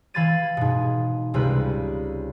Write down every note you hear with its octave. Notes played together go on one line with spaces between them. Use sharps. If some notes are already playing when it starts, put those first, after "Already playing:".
E3 F5 B5 G#6 A6 D#7
G#2 B2
C#2 C3 G3 B4